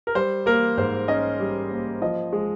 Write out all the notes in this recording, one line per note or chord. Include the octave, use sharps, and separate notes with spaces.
A#4
G3 C5
A#3 A#4
G#2 C5
C#4 D#5
G3
A#3
F3 D#5
G#3